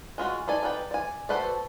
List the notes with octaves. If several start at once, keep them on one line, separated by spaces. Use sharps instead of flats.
G#3 F4 F#4
D#4 A4 D5 G#5
D#4 B4 D5 G5
D5 G#5
F#4 A4 B4 C5 D5